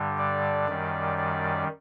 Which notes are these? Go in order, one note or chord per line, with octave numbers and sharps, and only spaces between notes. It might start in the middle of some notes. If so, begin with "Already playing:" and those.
Already playing: G2 D3 G3
D5
F#2 D#3 G3
D5